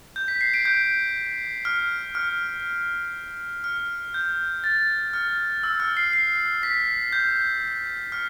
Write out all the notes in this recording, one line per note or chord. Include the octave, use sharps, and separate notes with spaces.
G6
B6
C7
D7
G6
F6
F6
F6
G6
A6
F6
E6
F6
C7
C7
B6
G6
F6